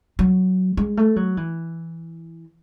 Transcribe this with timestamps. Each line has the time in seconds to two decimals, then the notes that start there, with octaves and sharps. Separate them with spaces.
0.19 F#3
0.77 G#3
0.97 A3
1.16 F#3
1.37 E3